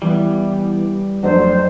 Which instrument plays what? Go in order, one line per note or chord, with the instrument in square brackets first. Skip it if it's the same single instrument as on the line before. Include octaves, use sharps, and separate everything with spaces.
[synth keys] E3 B3 [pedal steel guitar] G3
[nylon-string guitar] F2 A3 D4 [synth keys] F#3 [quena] C5